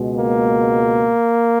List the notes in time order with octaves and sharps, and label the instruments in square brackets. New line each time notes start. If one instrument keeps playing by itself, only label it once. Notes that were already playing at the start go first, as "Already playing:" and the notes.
Already playing: [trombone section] C#2 B2 G#3
A#3